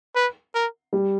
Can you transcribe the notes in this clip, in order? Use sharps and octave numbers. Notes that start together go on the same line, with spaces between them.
B4
A#4
G3